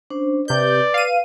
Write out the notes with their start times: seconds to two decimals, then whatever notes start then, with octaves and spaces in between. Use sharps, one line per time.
0.10 C#4 D4 C5
0.48 C3 B4 D5 G6
0.94 F5 D#7